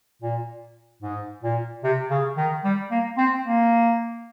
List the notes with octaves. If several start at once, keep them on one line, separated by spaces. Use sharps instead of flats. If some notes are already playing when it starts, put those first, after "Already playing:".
A#2
G#2
A#2
C3
C#3
D#3
G3
A#3
C4
A#3